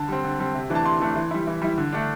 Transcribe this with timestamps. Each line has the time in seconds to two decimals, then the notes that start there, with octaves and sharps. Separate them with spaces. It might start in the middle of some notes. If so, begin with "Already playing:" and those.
Already playing: D3 A5
0.08 G3 C4
0.24 D3
0.39 G3 C4
0.55 C3
0.70 E3 A3 D4
0.75 A5
0.85 C3 C6
1.00 E3 A3 D4
1.16 E3
1.31 G3 E4
1.47 E3
1.62 G3 E4
1.78 D3
1.92 A3 D4